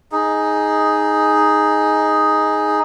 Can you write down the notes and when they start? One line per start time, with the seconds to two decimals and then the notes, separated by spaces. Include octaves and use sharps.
0.12 D#4 G#4